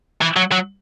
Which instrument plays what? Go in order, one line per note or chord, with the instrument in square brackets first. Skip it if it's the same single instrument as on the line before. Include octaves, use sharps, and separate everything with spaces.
[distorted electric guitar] E3
F#3
F#3